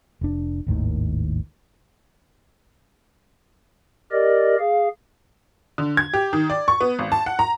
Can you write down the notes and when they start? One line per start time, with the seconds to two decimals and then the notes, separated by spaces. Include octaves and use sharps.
0.21 F1 D4
0.67 G#1 D#2 A2 D#3
4.12 G4 A#4 D5 D#5
4.59 G#4 F5
5.78 D3
5.97 G#6
6.14 G4
6.33 D#3
6.50 D5
6.68 C#6
6.81 B3
6.99 G#1
7.12 A5
7.26 F#5
7.39 A#5